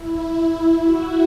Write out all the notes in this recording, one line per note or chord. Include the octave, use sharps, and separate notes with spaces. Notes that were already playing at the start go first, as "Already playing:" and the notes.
Already playing: E4
F#4